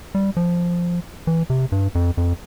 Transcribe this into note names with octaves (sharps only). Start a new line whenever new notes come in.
G3
F3
E3
C3
G2
F2
F2